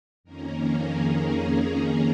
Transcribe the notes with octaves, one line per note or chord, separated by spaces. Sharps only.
F2 D#3 A#3 C#4 A#4
G#4